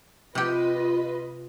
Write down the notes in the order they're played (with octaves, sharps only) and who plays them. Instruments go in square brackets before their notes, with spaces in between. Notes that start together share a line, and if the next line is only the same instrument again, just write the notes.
[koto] C3 G4 [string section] F4 B4 D#5